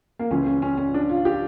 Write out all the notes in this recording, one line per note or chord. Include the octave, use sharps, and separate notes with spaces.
A#3
C#2 C#3 E3 C#4
C#4
C#4
C#4
D4
F4
G4